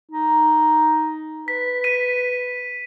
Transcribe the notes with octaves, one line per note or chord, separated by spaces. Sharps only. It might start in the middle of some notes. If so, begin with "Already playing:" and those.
D#4
B4 B6
B6 D#7